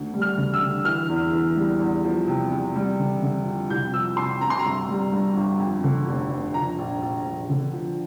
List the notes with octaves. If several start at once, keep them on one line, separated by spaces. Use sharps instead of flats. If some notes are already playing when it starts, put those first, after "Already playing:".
Already playing: D2
G3
F6
D3
E6
D3
E3 F6
E2
E3
G3
E2
F3
C3
C3
G3
D3
D3
F2
C2 G6
F3 E6
C3 C6
C3 A#5
C6
A#5
G1
G3
G2
G1
F2
D3
F1
F1
F3 A#5
A#1
A#1
A#1
D3
F3